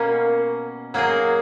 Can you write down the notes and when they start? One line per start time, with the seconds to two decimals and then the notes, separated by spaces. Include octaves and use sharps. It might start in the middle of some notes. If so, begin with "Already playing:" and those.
Already playing: B2 A#3 C#4
0.94 F#3 A#3 D#4 G#4